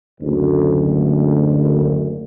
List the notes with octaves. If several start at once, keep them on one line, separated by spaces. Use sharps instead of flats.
F#1 D2